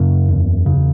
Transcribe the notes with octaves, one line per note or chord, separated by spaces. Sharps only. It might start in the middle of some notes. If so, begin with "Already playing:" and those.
Already playing: F#2 C#3 A#3
E2
C#3